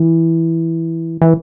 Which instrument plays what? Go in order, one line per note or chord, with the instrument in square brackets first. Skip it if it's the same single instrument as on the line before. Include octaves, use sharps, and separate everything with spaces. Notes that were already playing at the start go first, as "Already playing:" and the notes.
Already playing: [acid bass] E3
E3